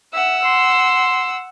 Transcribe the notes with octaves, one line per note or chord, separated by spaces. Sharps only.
E5 F#5 E6
C6